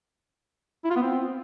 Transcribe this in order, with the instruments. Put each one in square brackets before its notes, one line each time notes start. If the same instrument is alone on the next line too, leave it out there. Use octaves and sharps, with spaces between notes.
[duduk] E4
F4
B3
C4